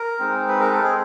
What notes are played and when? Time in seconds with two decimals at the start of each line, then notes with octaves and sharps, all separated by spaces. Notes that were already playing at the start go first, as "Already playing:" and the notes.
Already playing: A#4
0.19 G#3 C4 D#4
0.48 B4
0.60 A#4
0.72 A4
0.83 G#4